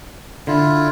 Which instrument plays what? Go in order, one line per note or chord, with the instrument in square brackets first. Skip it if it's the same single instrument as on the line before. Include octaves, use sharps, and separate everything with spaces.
[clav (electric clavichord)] D3 [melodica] E4 F4